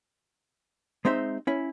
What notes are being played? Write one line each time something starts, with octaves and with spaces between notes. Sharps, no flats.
G#3 C4 D#4 C5 E5
C#4 E4